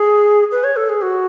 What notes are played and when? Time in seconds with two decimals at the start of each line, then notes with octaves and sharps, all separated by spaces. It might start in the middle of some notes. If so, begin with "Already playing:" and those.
Already playing: G#4
0.52 B4
0.64 C#5
0.76 A4
0.89 G#4
1.02 F#4